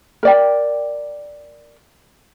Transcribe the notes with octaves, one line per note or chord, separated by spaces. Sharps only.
A#4 D5 G5